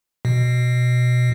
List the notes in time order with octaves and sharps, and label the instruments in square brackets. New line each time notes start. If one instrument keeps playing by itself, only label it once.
[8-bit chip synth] B2